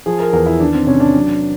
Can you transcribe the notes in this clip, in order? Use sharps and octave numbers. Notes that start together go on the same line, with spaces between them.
F3 G#4
A#4
E2 A#4
E4
D#3 D4
C4
C3 C#4
D4
F#3